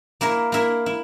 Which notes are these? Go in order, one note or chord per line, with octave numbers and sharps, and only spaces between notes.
A#3 E4 A#4 E5
A#3 E4 A#4 E5
E4